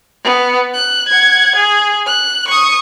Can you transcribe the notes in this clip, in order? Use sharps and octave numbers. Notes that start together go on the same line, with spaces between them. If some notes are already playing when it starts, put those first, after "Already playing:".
B3
F#6
F#5 G#6
G#4
F#6
C#6 D#6